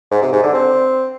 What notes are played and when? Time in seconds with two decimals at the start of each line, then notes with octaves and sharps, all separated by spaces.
0.11 G#2
0.22 C3
0.33 G#2
0.43 D3
0.54 C4